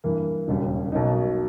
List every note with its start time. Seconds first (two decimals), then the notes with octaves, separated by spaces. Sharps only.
0.04 G2 E3 A#3
0.48 E1 D#2 C#3 G3
0.92 B1 B2 A#3 D#4